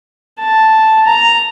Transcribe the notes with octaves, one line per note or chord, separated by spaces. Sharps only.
A5
A#5